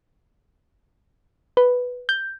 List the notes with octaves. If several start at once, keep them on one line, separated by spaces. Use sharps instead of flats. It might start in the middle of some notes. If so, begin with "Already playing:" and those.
B4
G6